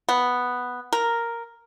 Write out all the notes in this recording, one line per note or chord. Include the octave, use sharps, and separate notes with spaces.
B3
A#4